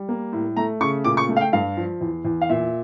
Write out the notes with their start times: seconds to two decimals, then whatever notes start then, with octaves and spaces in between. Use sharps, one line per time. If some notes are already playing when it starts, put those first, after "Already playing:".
Already playing: G3
0.09 A#3
0.33 A2
0.57 A3 A#5
0.81 C#3 C#6
1.04 A#2 D6
1.17 C#6
1.29 A3
1.36 F5
1.41 G5
1.53 G2 F5
1.77 F3
2.01 E2
2.25 E2
2.41 F5
2.49 A#2 E5